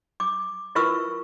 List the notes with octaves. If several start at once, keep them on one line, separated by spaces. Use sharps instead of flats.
D6
E4 F4 A#4 B4 C#6 E6